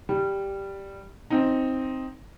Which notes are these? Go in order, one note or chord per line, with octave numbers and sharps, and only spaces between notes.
G3
C4 D#4